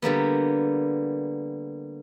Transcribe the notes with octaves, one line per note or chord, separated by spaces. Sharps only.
D3 G3 A#3 B3